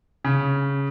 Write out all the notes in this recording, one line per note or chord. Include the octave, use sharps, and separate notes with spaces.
C#3